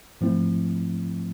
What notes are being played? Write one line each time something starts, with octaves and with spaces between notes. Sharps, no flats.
G#2 F3 A3 C4 E4